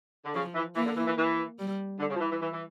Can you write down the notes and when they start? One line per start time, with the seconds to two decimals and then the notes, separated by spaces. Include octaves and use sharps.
0.25 D3
0.34 C#3 F3
0.55 E3
0.76 E3 A#3
0.86 D3
0.97 E3
1.07 E3
1.17 E3
1.59 G3
1.99 D3
2.10 C#3
2.16 F3
2.20 E3
2.31 E3
2.41 E3
2.53 E3